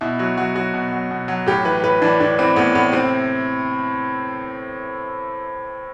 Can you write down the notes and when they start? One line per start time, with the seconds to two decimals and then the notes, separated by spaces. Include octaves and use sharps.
0.01 B2 E4
0.19 F#3 F#4
0.37 F#3 F#4
0.55 F#3 F#4
0.74 B2
0.92 F#3
1.11 B2
1.28 F#3
1.46 A2 G4
1.65 E3 B4
1.84 A2 B4
2.02 E3 D4
2.20 A2 D4
2.38 E3 C4
2.56 A2 B3
2.75 A2 B3
2.93 C3 C4